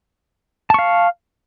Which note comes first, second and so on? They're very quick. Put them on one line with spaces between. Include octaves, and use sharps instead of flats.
A5 C#6 F5